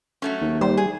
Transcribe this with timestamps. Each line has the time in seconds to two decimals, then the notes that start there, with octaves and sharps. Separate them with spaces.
0.22 F#3 A3 C#4
0.41 D#2
0.61 G3 C5
0.77 G#4